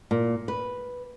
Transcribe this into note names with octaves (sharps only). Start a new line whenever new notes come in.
A#2
B4